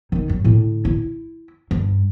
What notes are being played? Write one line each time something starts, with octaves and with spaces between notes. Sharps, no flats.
D#3 D#4
F#2
A2 D3
E4
G2